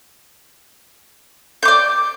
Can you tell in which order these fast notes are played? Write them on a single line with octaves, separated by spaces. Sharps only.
G6 D6 D5